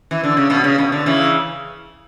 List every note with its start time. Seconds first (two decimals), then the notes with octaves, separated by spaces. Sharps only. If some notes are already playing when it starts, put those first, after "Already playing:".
0.11 E3
0.24 D3
0.37 C#3
0.50 B2
0.64 C#3
0.78 B2
0.92 D3
1.06 C#3 E3